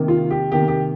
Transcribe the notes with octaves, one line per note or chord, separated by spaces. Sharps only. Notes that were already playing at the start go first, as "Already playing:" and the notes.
Already playing: C3 D#3 A#3
F4
G4
C3 D#3 A#3 G4
G4